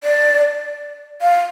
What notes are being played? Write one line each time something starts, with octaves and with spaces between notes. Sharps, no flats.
D5
F5